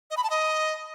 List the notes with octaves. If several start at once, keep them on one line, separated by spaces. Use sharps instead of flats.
D#5
B5
A5
D#5